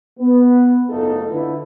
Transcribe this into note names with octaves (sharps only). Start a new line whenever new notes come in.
B3
F#1 G#2 A3 D#4 F4 A4
D3 E4 B4